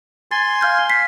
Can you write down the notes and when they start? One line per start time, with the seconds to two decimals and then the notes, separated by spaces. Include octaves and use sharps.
0.31 G#5 C6 A6
0.61 F5 F6 G6
0.90 B6 C7